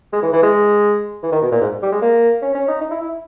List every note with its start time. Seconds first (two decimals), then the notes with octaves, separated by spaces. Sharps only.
0.13 G#3
0.23 E3
0.33 E3
0.43 G#3
1.23 E3
1.32 D#3
1.42 B2
1.52 A#2
1.62 G#2
1.83 G3
1.92 G#3
2.02 A#3
2.42 C#4
2.55 C#4
2.68 D#4
2.81 D#4
2.91 E4
3.01 E4